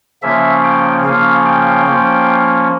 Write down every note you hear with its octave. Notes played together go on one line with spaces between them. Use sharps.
C#3 F3 A#3 C#4 E5
G5
C#3 F3 A#3 C#4 F5
G5
F3 A#3 C#4